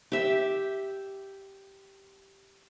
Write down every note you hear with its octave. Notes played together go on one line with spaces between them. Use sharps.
G4 E5